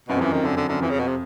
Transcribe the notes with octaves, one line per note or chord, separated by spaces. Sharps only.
F#2 B2
F2
F#2 E3
F2 D#3
F#2 D3
D3
F#2 D3
F2 E3
C#3
B2
C3